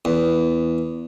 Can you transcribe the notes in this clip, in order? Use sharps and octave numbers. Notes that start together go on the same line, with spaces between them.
E2